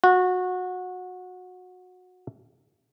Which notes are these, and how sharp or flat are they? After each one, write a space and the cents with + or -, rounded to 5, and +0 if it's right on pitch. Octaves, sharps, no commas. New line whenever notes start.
F#4 -20